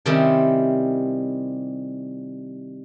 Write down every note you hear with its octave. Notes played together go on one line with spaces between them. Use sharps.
C3 D#3 G3 C4 C#4 E4